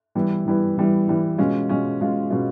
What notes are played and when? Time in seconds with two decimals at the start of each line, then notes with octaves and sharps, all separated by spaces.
0.15 E3 G3 B3 E4
0.45 E3 G3 B3 E4
0.77 E3 G3 B3 E4
1.08 E3 G3 B3 E4
1.38 B2 G#3 C#4 F4
1.69 B2 G#3 C#4 F4
2.01 B2 G#3 C#4 F4
2.30 B2 G#3 C#4 F4